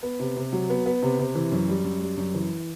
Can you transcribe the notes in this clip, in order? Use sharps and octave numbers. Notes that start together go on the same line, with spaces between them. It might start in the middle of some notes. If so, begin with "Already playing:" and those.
B3
C3
C3
F#3
B3
B3
C3
C3
E3
F#2
G3
F#2
G3
F#2
E3